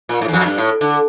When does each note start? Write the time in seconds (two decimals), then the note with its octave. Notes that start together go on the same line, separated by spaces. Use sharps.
0.09 A#2
0.21 A2
0.28 E2
0.33 F2
0.46 G2
0.58 A2
0.81 D3